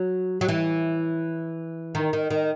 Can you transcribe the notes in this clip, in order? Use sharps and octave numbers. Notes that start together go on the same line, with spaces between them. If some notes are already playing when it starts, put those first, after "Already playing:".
Already playing: F#3
F#3
E3
D#3
D#3
D#3